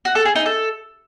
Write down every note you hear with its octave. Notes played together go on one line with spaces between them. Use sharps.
F#4
A4
G#4
D#4
A4